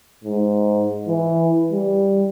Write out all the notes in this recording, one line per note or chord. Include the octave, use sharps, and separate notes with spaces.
G#2
E3
G3